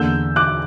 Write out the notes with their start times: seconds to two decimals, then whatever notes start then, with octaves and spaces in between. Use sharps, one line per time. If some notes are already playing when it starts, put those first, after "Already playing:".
Already playing: E2 D3 A#3 E6 G6
0.36 D6 F#6